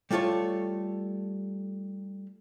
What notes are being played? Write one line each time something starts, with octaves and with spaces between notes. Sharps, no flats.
G3 A3 F4 A4 C#5